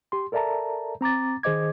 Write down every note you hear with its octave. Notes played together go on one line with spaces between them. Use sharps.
G4 C6
A4 A#4 D5 E5 A5 A#5
C4 A#5 D6 A6
D#3 G#4 C5 D#5 D6 G#6